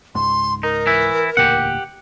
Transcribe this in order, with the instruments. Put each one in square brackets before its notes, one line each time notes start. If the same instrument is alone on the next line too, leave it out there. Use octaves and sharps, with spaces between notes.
[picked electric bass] C#2 G#2 [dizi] C6
[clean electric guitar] D#4 [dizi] A#4
[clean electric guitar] E3 E4
[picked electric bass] E1 D2 A#2 [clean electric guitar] G4 F#5